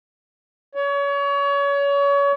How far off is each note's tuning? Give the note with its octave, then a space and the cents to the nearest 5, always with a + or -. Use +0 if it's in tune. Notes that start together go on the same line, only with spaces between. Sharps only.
C#5 +30